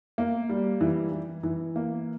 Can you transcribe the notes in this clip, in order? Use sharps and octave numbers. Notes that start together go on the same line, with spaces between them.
A#3
G3
E3
E3
E3
A#3